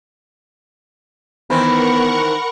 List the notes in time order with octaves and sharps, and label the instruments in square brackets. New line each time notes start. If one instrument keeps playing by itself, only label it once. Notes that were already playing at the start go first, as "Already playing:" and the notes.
[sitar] D#3 E3 C4 [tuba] B3 [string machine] A#4 F#5 C#6 [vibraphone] B5